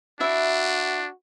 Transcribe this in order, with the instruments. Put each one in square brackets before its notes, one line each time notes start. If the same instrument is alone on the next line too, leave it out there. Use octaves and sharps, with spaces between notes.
[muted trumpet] D4 [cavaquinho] E4 E5 [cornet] F#4